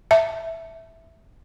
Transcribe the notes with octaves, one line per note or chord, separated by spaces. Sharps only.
E5 A5